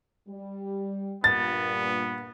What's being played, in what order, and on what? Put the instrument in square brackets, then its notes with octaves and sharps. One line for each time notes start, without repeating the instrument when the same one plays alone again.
[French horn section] G3
[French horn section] G2 A#2 [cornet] B3 [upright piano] A6